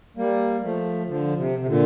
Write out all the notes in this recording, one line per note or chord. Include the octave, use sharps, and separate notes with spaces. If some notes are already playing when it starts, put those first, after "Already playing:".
G3 A#3
F3 A3
D3 F3
C3
C3
A#2 D3